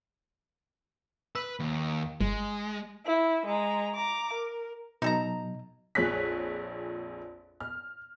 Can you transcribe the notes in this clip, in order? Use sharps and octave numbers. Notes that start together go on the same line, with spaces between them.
B4 E6
D#2
G1 G#3
E4
G#3 A#5
A#5 D6
A#4
B2 F#3 D#4 A4 A#5
A#1 F2 G#4 C#5 F#6 B6
F6